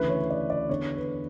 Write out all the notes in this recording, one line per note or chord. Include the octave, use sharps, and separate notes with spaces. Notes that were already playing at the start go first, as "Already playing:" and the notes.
Already playing: D2 C#3 E3 B4
C#5
D5
D5
E2 D3 C#5
B4